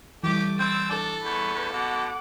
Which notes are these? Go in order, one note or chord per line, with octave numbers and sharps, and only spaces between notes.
E3 G3 A3 G4 D6
C4 E6 A6
D4 A4
E2 B4 C#6
B2 F#5 D6